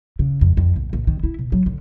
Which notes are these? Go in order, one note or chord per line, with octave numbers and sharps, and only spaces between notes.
C#3
F2
F2
A#1
A#1
D#3
E4
B2
F#3
D3